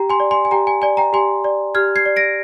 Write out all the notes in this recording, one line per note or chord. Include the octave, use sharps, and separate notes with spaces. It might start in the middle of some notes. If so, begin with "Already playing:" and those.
Already playing: G4 G5 A#5
G#5 C6
D5
G#5 C6
G#5
G4 G5 A#5
G#5
D5 G#5
G5 A#5
G4 G#5 C6
D5
G4 F6 G#6
G#6 C7
D5
A#6 D7